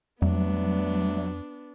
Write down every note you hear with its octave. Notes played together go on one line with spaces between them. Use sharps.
F2 F#3 G3 A3 B3 D4